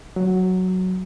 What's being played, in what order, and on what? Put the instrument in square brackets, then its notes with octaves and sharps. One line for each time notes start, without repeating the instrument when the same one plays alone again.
[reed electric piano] F#3